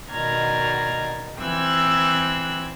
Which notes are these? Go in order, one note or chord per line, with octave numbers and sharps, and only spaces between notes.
B2 D#3 D5 A#5 F6 G#6
E3 C4 G5 E6 F#6 G#6